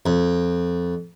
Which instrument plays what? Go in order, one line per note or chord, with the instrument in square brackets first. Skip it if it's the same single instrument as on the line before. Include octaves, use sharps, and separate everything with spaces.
[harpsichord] F2